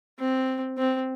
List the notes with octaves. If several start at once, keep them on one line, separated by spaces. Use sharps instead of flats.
C4
C4